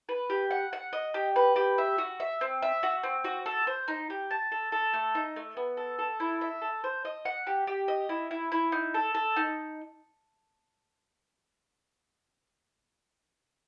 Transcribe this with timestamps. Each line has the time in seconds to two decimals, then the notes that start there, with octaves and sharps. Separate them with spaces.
0.09 B4
0.30 G4
0.51 F#5
0.73 F#5
0.93 D#5
1.14 G4
1.36 B4
1.56 G4
1.78 E5
1.98 F#4
2.20 E5
2.41 C4
2.62 E5
2.83 F#4
3.03 C4
3.24 F#4
3.46 A4
3.67 C5
3.88 D#4
4.10 G4
4.31 A5
4.52 A4
4.72 A4
4.93 A3
5.15 D#4
5.36 A3
5.57 B3
5.77 A4
5.99 A4
6.20 E4
6.41 E5
6.62 A4
6.84 C5
7.05 D#5
7.25 F#5
7.47 G4
7.67 G4
7.88 D#5
8.09 E4
8.31 E4
8.52 E4
8.72 D#4
8.94 A4
9.15 A4
9.36 D#4